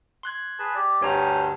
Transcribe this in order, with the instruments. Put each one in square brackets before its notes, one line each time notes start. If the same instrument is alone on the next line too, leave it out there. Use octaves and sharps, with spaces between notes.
[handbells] C6 F#6 G#6
[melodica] G#4 B4 A5
G4 D5
[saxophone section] D2 G2 [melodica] C5 G#5 [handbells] C#5 A#5